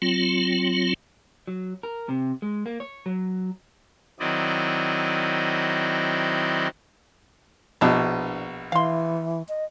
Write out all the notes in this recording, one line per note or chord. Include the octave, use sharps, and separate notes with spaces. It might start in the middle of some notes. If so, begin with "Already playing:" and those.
F#3 C4 F4
F#3
A#4
C3
G#3
A#3
C#5
F#3
D#3 F#3 C4 E4 D5 D#5
A#1 B2 B3 D4 E4
E3 F5 C6
D#5